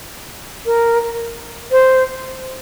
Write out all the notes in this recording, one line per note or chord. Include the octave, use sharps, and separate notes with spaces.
A#4
C5